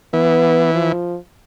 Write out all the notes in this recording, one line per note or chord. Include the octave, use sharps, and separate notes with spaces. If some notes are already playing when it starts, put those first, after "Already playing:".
E3 B3
F3